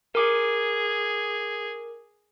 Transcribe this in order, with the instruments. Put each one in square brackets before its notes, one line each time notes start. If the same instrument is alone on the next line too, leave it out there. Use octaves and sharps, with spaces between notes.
[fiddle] G#4 [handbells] A#4 D6